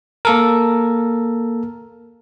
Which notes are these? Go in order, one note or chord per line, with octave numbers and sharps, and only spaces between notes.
A#3 A4 A#4